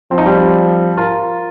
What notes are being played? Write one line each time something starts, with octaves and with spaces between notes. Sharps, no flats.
F3 C4
D#4
G3 C4
F4 A#4